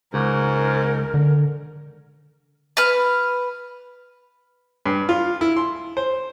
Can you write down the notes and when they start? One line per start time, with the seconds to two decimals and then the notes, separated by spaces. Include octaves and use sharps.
0.14 C#2 G#2 A#4
1.14 D3
2.77 B4 F6
4.86 G2
5.09 F4
5.41 E4
5.57 C6
5.97 C5